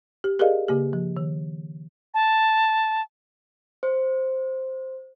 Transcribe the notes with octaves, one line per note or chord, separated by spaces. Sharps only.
G4
G4 G#4 A#4 D5 D#5 F5
C#3 A#3 G4
F3
D#3
A5
C5